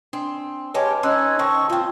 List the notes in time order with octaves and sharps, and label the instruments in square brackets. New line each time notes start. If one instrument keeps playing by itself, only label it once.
[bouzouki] C4 [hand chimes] D4
[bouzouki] G#3 C#4 G4 [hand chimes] B4 A5 D6 [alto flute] C#5
[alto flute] C#4 [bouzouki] D#4 [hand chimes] C6 E6 F#6
[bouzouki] D#3 C4 [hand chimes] A5 E6 [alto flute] C#6
[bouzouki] C4 C5 [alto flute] F4